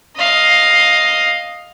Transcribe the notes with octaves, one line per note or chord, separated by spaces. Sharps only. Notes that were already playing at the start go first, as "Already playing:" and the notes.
D#5 F5